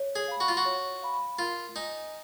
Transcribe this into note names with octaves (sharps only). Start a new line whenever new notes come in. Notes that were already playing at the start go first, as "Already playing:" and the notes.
Already playing: C#5
G#4
F5 B5
F#4
F4
F#4
C#5
F5 B5
F4 A#4
D#4 D#5 G#5